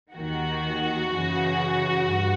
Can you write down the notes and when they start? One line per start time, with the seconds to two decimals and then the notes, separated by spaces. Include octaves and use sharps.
0.14 D#2 D#3 F#4
1.09 F#2 C#3 E3
2.03 G2